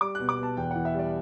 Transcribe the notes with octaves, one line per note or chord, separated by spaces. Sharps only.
G3 D6
B2 F#6
D6
B2 A5
E2 G5
E3 F#5
E5
G3 D5